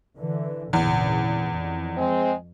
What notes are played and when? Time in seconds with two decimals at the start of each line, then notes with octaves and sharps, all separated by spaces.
0.18 D3 E3
0.73 G#1 E2 A#2 C#3
1.49 F2
1.97 G#3 C4